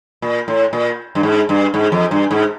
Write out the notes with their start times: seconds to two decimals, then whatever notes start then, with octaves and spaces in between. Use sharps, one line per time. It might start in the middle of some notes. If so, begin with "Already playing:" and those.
0.22 A#2
0.48 A2
0.73 A#2
1.15 G2
1.23 G#2
1.49 G2
1.74 G#2
1.92 F2
2.11 G2
2.31 G#2